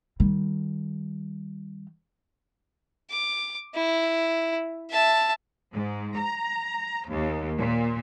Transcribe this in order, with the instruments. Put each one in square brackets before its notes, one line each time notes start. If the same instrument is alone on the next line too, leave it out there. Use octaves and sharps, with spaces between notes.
[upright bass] D#3 G3
[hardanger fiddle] D6
E4
E5 A5
[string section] G#2
A#5
D#2
A#2